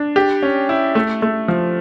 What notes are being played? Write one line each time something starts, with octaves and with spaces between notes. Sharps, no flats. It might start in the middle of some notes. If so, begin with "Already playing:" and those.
Already playing: D4
G4
C#4
E4
A3
A3
F3